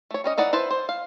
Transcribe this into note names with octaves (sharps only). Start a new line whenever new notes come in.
A3 C#5
G3 C#4 D#5
E3 D#4 D5 F#5
E4 B4 C5 A5
C5
F5